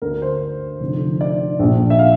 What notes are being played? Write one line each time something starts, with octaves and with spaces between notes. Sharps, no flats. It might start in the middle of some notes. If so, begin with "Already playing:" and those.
D2 D3 A#4
C5
F1 F2 D3
D5
A#1 A#2
E5
F5